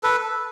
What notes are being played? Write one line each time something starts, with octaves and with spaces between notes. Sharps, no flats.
A4 B4